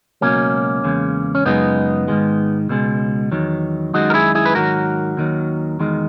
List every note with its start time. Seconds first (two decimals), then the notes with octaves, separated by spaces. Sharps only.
0.21 C#2 B2 F#3 A#3 C#4
0.84 E2 C#3 G#3
1.35 C#4
1.45 F#2 C#3 G#3 B3 D#4
2.08 G#2 D#3 G#3
2.69 C#2 B2 G#3
3.31 E2 D#3 F#3
3.94 F#2 D#3 G#3 D#4 F#4
4.10 A#4
4.14 E4 G#4
4.35 E4 G#4
4.46 B4
4.55 G#2 D#3 F#3 F#4 A#4
5.17 D#2 D#3 F#3
5.80 E2 D#3 G#3